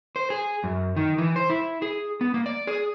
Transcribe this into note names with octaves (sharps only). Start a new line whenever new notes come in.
C5
G#4
F#2
D#3
E3
C5
E4
G#4
B3
A#3
D5
G#4